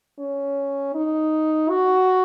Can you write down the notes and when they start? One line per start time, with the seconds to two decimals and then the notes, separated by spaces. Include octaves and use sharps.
0.19 C#4
0.94 D#4
1.69 F#4